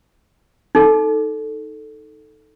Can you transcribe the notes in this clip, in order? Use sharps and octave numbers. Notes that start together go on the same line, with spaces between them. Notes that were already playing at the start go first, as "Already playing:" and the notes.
D#4 A4